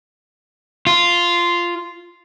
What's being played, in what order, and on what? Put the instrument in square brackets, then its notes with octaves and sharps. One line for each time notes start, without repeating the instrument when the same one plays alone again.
[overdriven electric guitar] F4